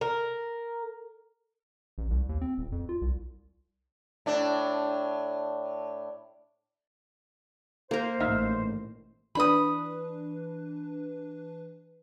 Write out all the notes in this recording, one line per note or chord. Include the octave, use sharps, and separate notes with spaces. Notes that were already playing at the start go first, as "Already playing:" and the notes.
A#4
A1
C2
D#2
C4
D#1
F2
F4
C2
A2 D4
A#3 A#4 C5
A1 D#4 E5 F5
E3 D4 B4 B5 D#6